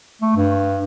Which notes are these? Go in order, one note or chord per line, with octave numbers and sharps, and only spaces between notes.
A3
G2